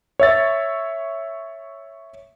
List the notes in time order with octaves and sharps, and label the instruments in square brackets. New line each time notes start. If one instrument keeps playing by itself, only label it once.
[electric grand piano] C#5 E5 A6